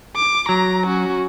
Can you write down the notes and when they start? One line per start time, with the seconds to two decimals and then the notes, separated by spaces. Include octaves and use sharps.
0.16 D6
0.49 F#3 A#5
0.86 C#4 F#4